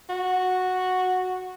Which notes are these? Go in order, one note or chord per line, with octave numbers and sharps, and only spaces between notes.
F#4